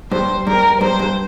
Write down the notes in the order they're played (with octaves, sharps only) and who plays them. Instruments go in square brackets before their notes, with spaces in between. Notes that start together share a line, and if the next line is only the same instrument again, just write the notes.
[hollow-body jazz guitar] G2 [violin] C5
[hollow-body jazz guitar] G2 [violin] A#4
[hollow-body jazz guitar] G2 [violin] C5
[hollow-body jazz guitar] G2